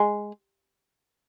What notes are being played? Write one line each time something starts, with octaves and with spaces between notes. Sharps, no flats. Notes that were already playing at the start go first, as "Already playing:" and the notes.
Already playing: G#3